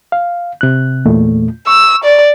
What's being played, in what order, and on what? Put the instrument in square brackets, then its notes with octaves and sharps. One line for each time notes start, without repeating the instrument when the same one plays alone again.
[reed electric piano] F5
C3 F#6
E2 A#2 A3
[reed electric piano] C#6 [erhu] E6
[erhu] D5